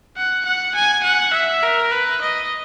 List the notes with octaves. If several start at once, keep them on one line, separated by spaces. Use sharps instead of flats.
F#5
F#5
G#5
F#5
E5
A#4
B4
D#5